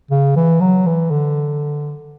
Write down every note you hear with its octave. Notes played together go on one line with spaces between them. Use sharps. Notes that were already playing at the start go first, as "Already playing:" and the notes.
C#3
E3
F#3
E3
D3